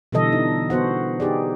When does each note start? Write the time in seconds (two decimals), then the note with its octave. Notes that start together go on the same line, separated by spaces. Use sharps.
0.12 B2 D3 E3 G3 A4 D#5
0.32 D#4
0.70 B3 F#4 C5 F#5
1.20 D#4 G4 G#4 D5